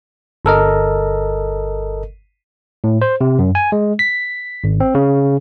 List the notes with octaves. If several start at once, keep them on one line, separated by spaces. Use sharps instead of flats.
G1 A4 A#4 D#5
A2
C5
C3
F#2
G#5
G#3
B6
G#1
C4
C#3